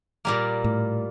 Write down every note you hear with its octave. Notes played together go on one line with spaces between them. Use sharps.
A#2 G3 A#3
A2